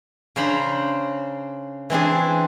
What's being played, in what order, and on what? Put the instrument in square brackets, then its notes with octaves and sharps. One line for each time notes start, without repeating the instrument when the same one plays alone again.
[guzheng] C#3 D4 C5 A#5 B5
E3 C4 D4 G#4